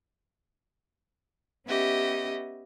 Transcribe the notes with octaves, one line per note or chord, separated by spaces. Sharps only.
B3 C#4 G4 D#5 E5